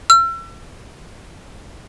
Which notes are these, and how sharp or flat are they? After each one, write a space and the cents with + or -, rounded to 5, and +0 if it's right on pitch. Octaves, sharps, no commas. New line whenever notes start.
E6 +40